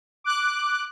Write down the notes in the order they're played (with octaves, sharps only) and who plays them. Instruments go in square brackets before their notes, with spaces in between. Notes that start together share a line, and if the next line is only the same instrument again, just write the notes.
[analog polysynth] D6 F#6